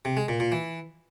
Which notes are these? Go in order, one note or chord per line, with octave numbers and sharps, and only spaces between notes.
C3
G#3
A#2
A#2
E3